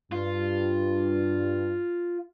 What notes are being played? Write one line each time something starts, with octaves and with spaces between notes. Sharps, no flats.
G2 F4